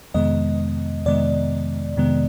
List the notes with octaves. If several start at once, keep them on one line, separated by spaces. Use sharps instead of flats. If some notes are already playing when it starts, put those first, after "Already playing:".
F2 C3 D#3 G#3 B3 D#5
F2 C3 D#3 G#3 B3 D5
F2 C3 D#3 G#3 B3